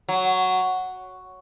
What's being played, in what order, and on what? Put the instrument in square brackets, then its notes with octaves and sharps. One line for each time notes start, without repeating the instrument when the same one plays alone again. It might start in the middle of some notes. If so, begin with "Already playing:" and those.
[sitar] F#3